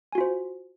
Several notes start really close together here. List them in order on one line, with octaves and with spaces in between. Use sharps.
G#5 F#4 F4 C5